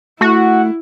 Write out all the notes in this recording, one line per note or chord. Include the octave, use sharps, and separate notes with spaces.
A3 E4 F#4